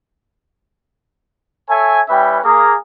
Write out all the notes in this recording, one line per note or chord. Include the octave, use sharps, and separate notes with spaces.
A4 C#5 E5 G#5
G3 C#4 E4 B4 E5 G5
A#3 G#4 A#4